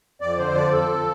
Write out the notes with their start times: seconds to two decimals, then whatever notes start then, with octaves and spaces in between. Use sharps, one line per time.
0.21 F2 D5
0.38 D3 C5
0.55 F3 D5
0.72 F2 A4